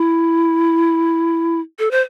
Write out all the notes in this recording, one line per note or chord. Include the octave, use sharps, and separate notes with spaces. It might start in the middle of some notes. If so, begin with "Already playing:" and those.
Already playing: E4
A4
C5